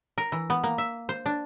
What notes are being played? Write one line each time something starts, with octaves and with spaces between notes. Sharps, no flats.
A#4
E3
B3
A#3
E5
C5
D4